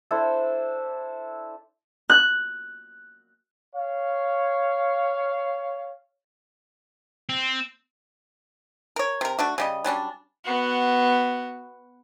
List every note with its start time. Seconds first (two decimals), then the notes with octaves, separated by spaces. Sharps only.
0.11 D4 E4 A4 C5
2.10 F#6
3.74 C#5 F5
7.29 C4
8.96 A#4 C#5
9.21 C3 A#4
9.39 A3 D4 F#4
9.58 C#3 G3 D#5
9.84 F#3 G3 C#4 D4
10.45 B3 F#4